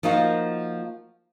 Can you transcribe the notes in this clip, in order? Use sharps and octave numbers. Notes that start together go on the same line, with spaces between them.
F3 A#3 D#4 F4 F#4